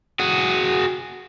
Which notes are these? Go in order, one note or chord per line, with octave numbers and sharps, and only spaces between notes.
F#4 G#4